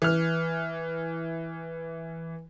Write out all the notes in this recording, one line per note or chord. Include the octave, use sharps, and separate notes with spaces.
E3 F6